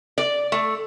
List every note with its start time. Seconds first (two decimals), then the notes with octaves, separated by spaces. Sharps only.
0.18 D5
0.52 A3